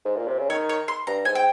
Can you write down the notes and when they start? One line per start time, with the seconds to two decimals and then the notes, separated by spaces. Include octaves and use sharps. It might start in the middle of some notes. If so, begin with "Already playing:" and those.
0.05 G#2
0.17 A#2
0.28 C3
0.39 C#3
0.50 D#3 C#5
0.69 C#5
0.88 C6
1.07 G2 A#5
1.25 G#2 G#5
1.35 G5